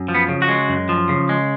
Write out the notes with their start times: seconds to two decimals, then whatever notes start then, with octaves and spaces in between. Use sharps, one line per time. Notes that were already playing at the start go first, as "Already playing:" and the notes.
Already playing: F#2
0.08 F3
0.15 B3
0.29 C#3
0.42 F#4
0.48 G#3
0.69 F#2
0.89 F3
1.09 C#3
1.29 G#3